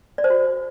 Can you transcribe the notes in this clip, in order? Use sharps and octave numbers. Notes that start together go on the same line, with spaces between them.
D5
C5
F#4